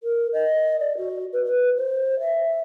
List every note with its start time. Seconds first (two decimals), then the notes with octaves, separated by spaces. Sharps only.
0.03 A#4
0.33 D#5
0.80 D5
0.97 F#4
1.32 B4
1.44 B4
1.77 C5
2.20 E5